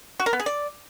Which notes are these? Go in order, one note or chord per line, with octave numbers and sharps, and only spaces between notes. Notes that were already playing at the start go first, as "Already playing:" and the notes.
F#4
A#4
B3
G#4
D5